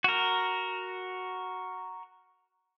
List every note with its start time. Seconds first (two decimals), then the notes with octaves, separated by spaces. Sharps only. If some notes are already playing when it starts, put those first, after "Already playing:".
0.04 F#4 A#4